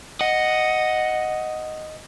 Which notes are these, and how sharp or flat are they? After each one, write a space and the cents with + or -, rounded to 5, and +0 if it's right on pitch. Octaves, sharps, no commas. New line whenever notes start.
D#5 +0 F#5 +0